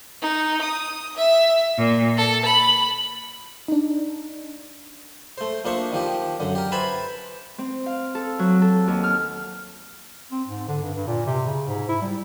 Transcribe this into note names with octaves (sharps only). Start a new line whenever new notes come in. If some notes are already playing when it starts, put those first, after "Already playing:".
D#4
D#6
E5
A#2
A4
B5
D4 D#4
A3 C5
A#1 A#3 D4 C5 E5 C#6
D#3 F3 G4
F#2 D3
G4 A#4
B4 C5 E5 G#5 A5 B5
C4
F5
A4
F#3
A4
D#2
F6
C4
G#2
D3
G2
G2
A#2
C3
C#3
G#2
E4
G3